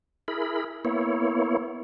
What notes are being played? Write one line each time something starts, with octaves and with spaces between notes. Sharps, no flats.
E4 G#4 A#4 B5
A#3 B3 E4 C#5